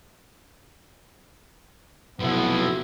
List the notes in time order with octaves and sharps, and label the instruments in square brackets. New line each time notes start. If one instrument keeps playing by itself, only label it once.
[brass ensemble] B1 B3 E4 [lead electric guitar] C3 F3